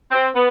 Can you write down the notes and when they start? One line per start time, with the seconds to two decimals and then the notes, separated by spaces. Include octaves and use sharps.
0.11 C4
0.35 B3